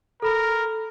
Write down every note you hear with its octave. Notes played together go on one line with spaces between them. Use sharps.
A4 A#4 B5